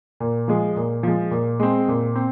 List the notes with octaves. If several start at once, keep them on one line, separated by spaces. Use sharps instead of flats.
A#2
F3 G#3
A#2
F3 G#3
A#2
G#3 C4
A#2
C4